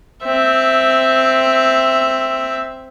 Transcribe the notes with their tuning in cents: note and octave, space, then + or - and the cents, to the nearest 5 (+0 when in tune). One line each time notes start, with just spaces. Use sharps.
C4 +0 E5 +0